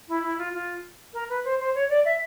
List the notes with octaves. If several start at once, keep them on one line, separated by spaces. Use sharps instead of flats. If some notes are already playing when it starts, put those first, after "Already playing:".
E4
E4
F4
F4
A#4
B4
C5
C5
C#5
D5
E5